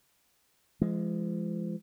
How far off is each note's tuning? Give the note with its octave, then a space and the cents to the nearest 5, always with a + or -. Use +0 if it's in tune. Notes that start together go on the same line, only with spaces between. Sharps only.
F3 -40 G#3 +0